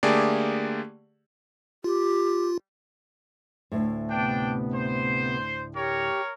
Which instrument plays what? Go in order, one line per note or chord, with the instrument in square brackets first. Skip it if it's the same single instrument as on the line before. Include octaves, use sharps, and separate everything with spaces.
[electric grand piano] D3 A3 A#3 G4 G#4 D5
[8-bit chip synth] F4 [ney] G4
[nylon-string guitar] D2 A2
[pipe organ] C3 B3 [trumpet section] D4 G5
[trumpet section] C5
[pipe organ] G4 [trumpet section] A#4 C#5